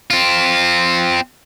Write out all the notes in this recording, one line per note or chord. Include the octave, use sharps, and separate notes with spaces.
C4 F4